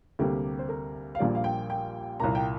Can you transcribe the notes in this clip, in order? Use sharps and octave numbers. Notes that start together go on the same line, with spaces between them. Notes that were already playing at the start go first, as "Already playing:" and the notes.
D2 C3 G3 A#3 G4
C5
A#4
F5
A#1 A#2 G3 A#3 D5
F5
G5
G5
C2 A#2 A#3 A#5
G5